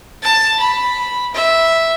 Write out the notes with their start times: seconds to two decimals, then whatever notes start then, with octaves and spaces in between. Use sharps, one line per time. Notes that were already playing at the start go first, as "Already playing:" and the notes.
0.22 A5
0.60 B5
1.34 E5